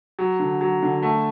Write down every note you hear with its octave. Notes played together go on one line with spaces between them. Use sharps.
F#3
D3
F#3
D3
A3